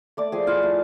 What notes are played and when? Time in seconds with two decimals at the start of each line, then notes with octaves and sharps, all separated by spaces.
0.17 A3 D5 D6
0.32 F3 G#4 G#5
0.47 E4 F4 F5
0.62 A3